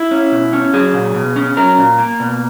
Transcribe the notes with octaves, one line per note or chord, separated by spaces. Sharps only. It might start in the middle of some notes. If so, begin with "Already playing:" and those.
Already playing: E4
C#4
B2
C#4
F#3 G#4
A#2
B2
C#4
F#3 A#4
A#2
A#3
B2